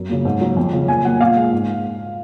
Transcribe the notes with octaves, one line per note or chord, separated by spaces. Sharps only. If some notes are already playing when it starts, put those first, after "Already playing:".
Already playing: F#2
C#3 F#3 A#3
G#2
F#3 A#3
F2
C#3 F#3
A#2 G#5
F#3 A#3 F#5
A#2 F5
G#3
G#2